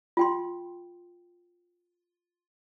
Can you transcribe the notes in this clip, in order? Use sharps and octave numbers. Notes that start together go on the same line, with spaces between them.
F4 G5 C6